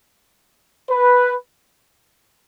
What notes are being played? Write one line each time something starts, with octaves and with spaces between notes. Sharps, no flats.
B4